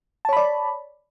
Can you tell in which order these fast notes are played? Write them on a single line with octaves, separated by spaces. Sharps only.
A5 C#5 B5 D5